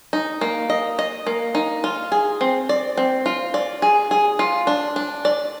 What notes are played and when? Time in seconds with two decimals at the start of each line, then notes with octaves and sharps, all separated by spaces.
0.13 D#4
0.41 A#3
0.70 D#5
0.99 D#5
1.27 A#3
1.55 D#4
1.84 F4
2.12 G#4
2.41 C4
2.69 D5
2.97 C4
3.26 F4
3.54 D5
3.82 G#4
4.11 G#4
4.39 F4
4.67 D4
4.96 D4
5.25 D5